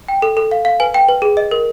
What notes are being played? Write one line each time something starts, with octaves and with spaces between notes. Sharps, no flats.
G5
A4
A4
F5
F5
B4 G#5
G5
B4
G#4
D#5
A#4